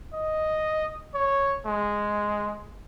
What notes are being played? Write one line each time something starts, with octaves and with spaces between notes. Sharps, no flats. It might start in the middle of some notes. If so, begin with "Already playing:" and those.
D#5
C#5
G#3